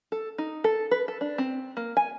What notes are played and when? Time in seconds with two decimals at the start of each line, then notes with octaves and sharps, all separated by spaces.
0.12 A4
0.38 D#4
0.64 A4
0.91 B4
1.08 A4
1.21 D4
1.38 C4
1.77 A#3
1.97 G#5